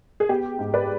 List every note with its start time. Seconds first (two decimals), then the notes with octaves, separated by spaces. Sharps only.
0.20 G#4
0.29 B3 G4
0.59 G#2
0.74 B4 D5